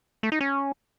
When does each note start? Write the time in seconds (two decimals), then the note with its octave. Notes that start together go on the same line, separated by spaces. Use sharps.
0.23 A3
0.32 D#4
0.40 C#4